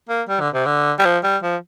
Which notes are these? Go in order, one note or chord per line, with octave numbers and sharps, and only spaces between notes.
A#3
G3
D3
C3
D3
G3
F3
G3
F3